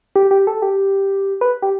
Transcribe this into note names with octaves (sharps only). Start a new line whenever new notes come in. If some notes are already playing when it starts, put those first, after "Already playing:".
G4
G4
A4
G4
B4
G4